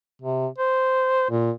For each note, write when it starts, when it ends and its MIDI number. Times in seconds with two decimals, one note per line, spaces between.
0.22 0.47 48
0.58 1.28 72
1.30 1.51 46